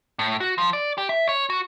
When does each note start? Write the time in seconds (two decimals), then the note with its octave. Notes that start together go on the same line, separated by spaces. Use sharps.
0.19 A2
0.40 F#4
0.58 F3
0.73 D5
0.98 G4
1.09 E5
1.29 C#5
1.50 F#4